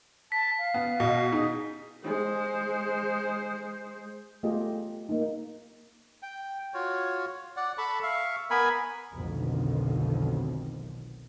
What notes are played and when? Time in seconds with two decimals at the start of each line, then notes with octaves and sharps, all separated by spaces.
0.32 A5 B6
0.59 F5
0.74 B3
1.00 B2
1.32 D#4 G#4
2.05 G#3 C5
4.43 A3 B3 F4 G4 G#4 D#5
5.09 A#3 D#4
6.23 G5
6.74 F4 F#4 C#5
7.57 D5 F#5
7.78 A4 A5 B5 C#6
8.02 E5 F5 C#6
8.50 B3 A#4 G#5 B5
9.13 F1 B1 F2 B2 D3 D#3